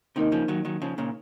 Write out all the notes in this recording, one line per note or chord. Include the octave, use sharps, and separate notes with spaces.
C3 D#3 A#3 D#4 A#4 D#5
C#3 F3
D#3 F#3
D#3 F#3
C#3 F3
A#2 C#3